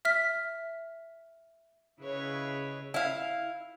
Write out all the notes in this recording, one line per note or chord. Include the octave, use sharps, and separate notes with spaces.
E5 F6 B6
C#3 E4 G#4 B4 C#5 D#5
E4 F5